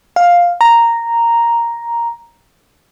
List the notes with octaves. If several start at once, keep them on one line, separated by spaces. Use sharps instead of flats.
F5
A#5